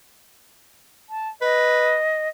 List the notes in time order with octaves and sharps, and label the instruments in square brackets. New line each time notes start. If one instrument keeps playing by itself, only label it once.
[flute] A5
[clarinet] B4 [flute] D#5